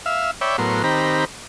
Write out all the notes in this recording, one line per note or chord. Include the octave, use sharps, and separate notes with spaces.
E5 F5
C#5 D5 E5 G5 B5
A2 F#3 B3 A#4 C6
D#3 C4 G4 A#5 B5